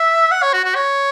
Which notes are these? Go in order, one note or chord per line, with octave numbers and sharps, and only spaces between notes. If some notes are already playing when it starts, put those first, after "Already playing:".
Already playing: E5
F#5
C#5
F#4
F#4
C#5